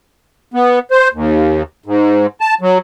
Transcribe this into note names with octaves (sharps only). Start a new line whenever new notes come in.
B3
C5
D#2
G#2
A5
F#3